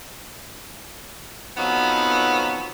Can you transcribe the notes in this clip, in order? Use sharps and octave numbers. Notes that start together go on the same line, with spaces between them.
F2 F3 F#3 B3 D#4